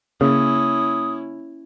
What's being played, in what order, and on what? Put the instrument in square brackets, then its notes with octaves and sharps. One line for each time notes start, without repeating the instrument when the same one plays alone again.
[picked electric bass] C#3 [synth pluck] A#3 [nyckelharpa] C#4 E4 [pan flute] D#6